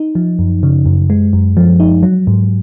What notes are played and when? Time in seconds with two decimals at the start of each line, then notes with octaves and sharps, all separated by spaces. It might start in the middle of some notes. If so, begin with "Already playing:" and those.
Already playing: D#4
0.15 F3
0.39 F#2
0.63 C#3
0.86 F#2
1.10 G#3
1.33 F#2
1.57 F3
1.80 D#4
2.03 F#3
2.27 G#2